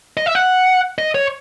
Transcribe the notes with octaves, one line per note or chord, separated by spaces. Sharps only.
D#5
E5
F#5
D#5
C#5